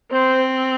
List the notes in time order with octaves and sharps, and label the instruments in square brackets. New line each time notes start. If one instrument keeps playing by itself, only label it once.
[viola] C4 [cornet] C5